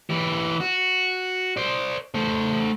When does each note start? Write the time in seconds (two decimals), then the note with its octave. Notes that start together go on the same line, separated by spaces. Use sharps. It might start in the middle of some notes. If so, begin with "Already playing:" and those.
0.10 E3 G4
0.60 F#4
1.57 C5 D5
2.14 A3 C5